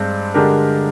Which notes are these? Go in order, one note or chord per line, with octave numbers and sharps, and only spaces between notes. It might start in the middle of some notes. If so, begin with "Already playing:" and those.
Already playing: G2 G#3 C4
D3 G#3 D4 G4 A#4